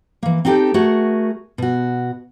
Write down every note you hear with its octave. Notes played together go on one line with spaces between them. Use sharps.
E3 A#3
C4 D#4 G4 A4 G5
A3 F#4 G#4 A#4
B2 F#4